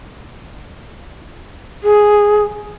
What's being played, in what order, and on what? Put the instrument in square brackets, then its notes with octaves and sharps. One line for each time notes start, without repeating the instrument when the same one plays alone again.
[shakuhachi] G#4